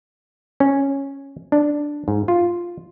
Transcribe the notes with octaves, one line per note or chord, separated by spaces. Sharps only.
C#4
D4
G#2
F4